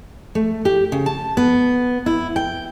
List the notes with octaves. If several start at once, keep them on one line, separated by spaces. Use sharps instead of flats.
A3
G4
C#3
A5
B3
E4
G5